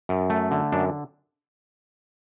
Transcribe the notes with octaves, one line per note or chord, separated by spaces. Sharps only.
F#2
A3
D3
F#2 D4